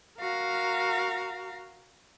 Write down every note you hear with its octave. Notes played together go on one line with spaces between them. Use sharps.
F#4 A#4 F5 A#5